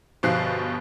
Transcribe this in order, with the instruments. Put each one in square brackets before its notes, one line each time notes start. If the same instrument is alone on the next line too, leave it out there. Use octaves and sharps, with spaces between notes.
[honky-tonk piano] G1 B2 F3 F#6 C7